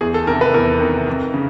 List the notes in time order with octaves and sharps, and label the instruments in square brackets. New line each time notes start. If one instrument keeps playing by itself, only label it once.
[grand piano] E2 G#4
A4
C3 D#3 A#4
B4
E2 A#4
C3 D#3
F2
C#3